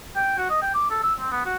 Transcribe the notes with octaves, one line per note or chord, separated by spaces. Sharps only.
G5
F#4
D#5
G5
D6
A4
E6
C4
B3
F#4